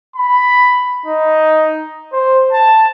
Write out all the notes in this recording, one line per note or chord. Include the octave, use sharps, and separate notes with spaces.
B5
D#4
C5
A5